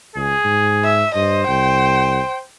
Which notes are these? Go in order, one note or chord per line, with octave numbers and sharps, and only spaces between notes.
C#2 G#4
G#2
E5
G2 C5 D#5
C2 G5